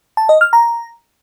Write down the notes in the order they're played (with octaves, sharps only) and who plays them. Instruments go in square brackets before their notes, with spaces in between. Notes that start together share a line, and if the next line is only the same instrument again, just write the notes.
[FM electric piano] A5
D#5
F6
A#5